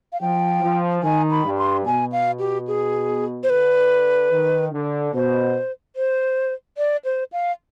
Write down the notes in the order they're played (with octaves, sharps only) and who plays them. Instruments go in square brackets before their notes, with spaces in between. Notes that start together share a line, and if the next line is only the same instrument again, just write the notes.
[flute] F5
[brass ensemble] F3 [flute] G5
[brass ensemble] F3
[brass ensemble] D#3 [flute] G#5
[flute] B5
[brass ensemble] G2
[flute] C6
[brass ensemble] B2 [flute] G#5
[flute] F5
G4
G#4
C5
[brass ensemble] D3 [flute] B4
[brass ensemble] D#3
D3
[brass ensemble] B2 [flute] C5
[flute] C5
D5
C5
F5